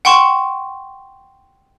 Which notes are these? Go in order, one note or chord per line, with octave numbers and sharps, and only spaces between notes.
F#5 G5 C6 C#6 E7